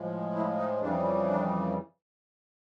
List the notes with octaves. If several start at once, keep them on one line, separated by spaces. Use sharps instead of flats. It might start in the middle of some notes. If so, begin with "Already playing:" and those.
Already playing: A2 F3 G#3
E4
D#4
F2 C#3 E3 G3 D4
D4